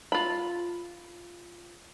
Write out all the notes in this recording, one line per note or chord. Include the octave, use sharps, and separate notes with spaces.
F4 B5